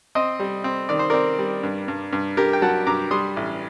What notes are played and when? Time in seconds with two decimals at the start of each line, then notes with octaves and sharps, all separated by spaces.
0.15 C4 C5 D#5
0.40 G3
0.64 C4
0.89 D#3 D5
0.99 C5
1.10 C4 A#4 D5
1.39 G3
1.63 G2
1.88 G2
2.13 G2
2.37 G2 G4 A#4
2.53 G5
2.62 F#3 F#5 A5
2.87 G2 A#5 D6
3.11 G3 C6 D#6
3.36 A1